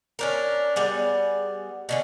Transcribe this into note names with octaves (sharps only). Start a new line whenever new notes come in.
C#4 D4 A#4
G3 B3 G#4
B2 D3 C#4